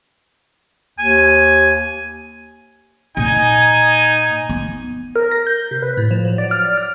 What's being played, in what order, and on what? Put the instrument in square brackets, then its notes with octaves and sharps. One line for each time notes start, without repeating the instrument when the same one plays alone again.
[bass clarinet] D#2 [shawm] G#5
[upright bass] A#2 [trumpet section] D#4 G#5
[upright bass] B3
[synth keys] A#4
A#6
G6
C3
B4
A2
F3
F#3
D5
F6
D5
F6